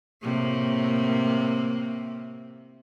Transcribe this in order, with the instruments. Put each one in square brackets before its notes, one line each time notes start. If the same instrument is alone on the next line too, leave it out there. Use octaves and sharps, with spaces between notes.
[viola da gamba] A2 C3 A#3